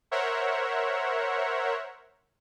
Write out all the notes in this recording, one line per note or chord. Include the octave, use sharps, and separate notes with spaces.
A#4 C5 C#5 E5 F#5